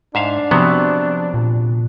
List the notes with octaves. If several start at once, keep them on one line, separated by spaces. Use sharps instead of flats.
G#2 D4 E5 F5
C3 F3 F#3 B3
A#2